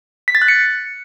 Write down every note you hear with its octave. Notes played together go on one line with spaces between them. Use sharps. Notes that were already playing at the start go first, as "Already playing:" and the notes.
B6
A6
F#6
C#7